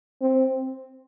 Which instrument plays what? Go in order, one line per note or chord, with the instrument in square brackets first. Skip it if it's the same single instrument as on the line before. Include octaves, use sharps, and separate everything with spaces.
[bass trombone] C4